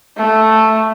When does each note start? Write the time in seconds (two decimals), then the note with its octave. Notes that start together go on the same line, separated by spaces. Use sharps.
0.17 A3